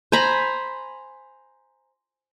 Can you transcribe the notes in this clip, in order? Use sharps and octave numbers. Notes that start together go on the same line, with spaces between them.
C5 G#5 A#5 B5